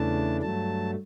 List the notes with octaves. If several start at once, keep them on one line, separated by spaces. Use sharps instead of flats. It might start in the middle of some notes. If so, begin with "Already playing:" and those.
Already playing: E2 C#3 E3 A3 D4 A5
G2 F#3 A3 A5